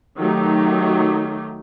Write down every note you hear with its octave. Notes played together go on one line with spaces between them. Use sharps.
D#3 F#3 A3 D#4 G4